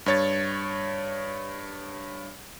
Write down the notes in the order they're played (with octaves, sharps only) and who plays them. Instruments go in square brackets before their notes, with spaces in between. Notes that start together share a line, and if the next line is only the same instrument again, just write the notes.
[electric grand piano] G2 C#5 A6